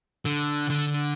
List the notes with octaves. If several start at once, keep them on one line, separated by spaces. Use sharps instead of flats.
D3
D3